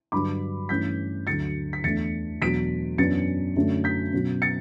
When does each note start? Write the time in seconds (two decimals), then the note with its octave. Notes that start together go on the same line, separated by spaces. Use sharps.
0.12 G2 D3 F#3 B5 D6
0.69 G2 E3 A3 C#4 G6 B6
1.27 D2 D3 F#3 A6 C#7
1.73 B6
1.84 E2 D3 A3 D4 A6 C#7
2.41 E2 B2 F#3 A3 D4 B6 D7
2.98 F#2 E3 B3 D4 A6 C#7
3.56 F#2 D3 F#3 A3 C#4
3.84 G6 B6
4.13 B2 F#3 C#4
4.42 A6 C#7